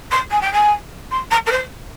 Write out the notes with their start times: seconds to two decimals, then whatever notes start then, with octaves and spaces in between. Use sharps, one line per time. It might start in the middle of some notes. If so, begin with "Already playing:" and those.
0.11 C6
0.30 G#5
0.41 G5
0.52 G#5
1.10 C6
1.31 A#5
1.46 A#4
1.51 C5